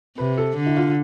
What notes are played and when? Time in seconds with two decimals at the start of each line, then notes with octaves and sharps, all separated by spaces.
0.18 C3 B4
0.37 A4
0.57 D3
0.66 E4
0.77 F4